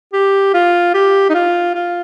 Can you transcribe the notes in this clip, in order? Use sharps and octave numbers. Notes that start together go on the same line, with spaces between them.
G4
F4
G4
D#4
F4
F4